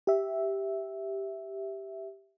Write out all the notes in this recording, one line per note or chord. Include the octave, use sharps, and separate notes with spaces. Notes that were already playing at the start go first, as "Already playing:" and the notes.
G4 E5